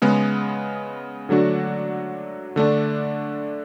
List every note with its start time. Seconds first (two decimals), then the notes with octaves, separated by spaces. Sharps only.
0.02 C#3 G#3 B3
1.29 D3 F#3 A3 D4 F#4
2.56 D3 A3 D4